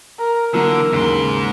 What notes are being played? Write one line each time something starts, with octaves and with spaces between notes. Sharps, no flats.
A#4
D3 E3 F#3 A#3 A#4
D#2 G#2 C#3 C6 D7